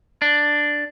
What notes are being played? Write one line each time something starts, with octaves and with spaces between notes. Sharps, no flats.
D4